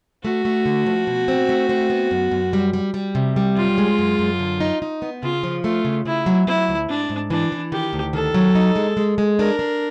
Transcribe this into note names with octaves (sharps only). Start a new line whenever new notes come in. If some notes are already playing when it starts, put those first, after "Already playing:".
A3 F#4
A3
D3
F3
B2
C4
A3
C4
B3
F#2
F#2
G3
G3
G3
C3
G3
F#2 F4
G#3
F#2
F#2
D3
D#4
D#4
B3
C#3 F4
F3
A3 F4
C#3
C#3 E4
F#3
F#3 E4
D2
G#2 D4
G#2
E3 D4
E3
D#3 G4
D2
D#3 A4
F#3
D#4
G#3
G#3
G#3
D4 A#4
D4